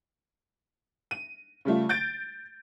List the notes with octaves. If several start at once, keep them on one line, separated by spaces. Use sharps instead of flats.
D#7
C#3 G3 A3 F4
G6 A6 D7